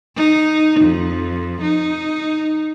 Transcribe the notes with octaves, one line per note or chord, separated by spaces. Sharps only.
D#4
F2
D#4